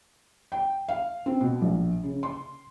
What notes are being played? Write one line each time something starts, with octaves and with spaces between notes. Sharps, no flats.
G5
F5
C4
B2
A#1
C#3
C6